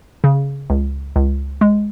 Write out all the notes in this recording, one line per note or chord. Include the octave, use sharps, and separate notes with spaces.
C#3
C#2
C#2
G#3